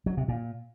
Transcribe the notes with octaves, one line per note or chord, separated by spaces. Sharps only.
F#3
C3
A#2